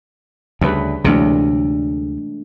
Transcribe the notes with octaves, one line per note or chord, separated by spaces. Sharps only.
D2 C#3 G3 B4
D2 C3 E3 F#3 G#3 A3 D4